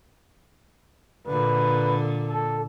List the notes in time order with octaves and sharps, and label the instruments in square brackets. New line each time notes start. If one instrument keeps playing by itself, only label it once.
[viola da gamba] A#2 D3 [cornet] B4
[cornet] A4